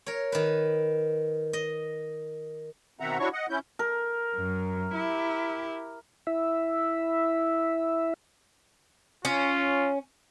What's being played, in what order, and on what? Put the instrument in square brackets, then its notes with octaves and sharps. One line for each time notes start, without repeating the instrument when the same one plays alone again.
[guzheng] A#4 C#5
D#3 B4
D#5
[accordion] B2 D#3 C4 E5 F#5 A#5
D4 E4 F#4 C#5 C#6
D#5 F#5
C#4 E4 G6
[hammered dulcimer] A#4
[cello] F#2
E4 G4
[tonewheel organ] E4 E5
[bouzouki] C#4 [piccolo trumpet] F4